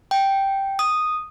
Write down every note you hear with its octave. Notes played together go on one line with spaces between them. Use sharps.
G5
D#6